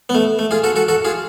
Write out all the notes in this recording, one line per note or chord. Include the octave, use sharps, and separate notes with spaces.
B3
A3
A3
F4 G#4
F#4 A4
F#4 A4
F#4 A4
F4 G#4